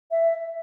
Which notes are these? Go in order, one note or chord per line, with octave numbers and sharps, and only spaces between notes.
E5